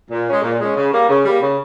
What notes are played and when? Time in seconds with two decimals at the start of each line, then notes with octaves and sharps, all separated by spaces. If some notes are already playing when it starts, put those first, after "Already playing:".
0.10 A#2
0.26 G#3 C#4
0.42 A#2
0.59 G#3 C#4
0.75 C#3
0.91 G3 A#3
1.08 C#3
1.24 G3 A#3
1.40 C#3